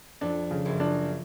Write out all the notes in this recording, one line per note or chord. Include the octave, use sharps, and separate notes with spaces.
F2 D4
C#3
F#1 F#2
D4